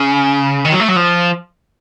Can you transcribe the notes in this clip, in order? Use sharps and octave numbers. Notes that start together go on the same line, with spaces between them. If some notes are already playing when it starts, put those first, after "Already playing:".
Already playing: C#3
D#3
F#3
A3
F#3
F3